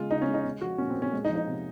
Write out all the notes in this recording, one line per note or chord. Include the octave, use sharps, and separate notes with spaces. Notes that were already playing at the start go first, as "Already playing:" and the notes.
Already playing: C#3 G#3 F4
C#3 D#4
C#4
G#3
D#4
G#3
F3 F#4
A#2 C#4
C4
A#2
C#4
G#3
D#4
F3
D#4
C3